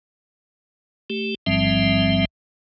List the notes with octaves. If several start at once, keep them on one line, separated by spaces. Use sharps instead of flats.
A3 G4
A1 G#2 F3 G3 C4 E5